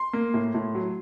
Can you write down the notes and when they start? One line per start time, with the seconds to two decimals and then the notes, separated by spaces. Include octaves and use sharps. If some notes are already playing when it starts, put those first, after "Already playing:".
Already playing: C6
0.13 A#3
0.34 A2
0.54 A2
0.75 F#3